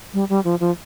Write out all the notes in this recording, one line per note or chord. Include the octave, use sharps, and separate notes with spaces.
G3
G3
F3
F3